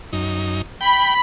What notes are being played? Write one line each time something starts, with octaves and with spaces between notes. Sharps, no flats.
F#2 D#4
G5 B5